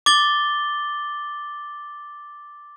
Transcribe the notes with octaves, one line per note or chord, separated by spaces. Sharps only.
D6 A6 G7